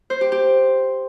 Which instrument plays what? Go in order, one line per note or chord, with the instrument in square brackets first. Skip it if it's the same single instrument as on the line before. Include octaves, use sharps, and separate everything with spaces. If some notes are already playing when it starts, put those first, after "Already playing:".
[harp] C5
G4
G4